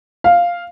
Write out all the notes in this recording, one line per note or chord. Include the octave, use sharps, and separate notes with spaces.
F5